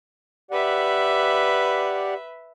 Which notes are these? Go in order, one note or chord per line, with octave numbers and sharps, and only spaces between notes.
G4 B4 D5 E5 F#5